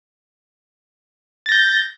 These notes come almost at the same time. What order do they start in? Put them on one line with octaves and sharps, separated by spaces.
A6 A#6 G6